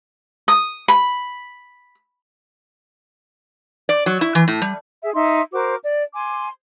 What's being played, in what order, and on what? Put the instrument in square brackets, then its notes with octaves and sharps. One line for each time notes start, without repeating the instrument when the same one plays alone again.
[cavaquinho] D#6
B5
[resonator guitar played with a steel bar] D5
F#3
E4
E3
A2
G3
[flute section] G#4 E5
D#4 E5 C6
F#4 A#4 C5 D6
D5
G#5 C6 D6